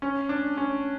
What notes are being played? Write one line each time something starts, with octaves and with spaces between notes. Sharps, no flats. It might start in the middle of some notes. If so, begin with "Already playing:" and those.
C#4
D4
C#4